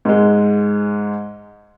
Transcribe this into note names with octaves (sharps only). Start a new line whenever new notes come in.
G#2 G#3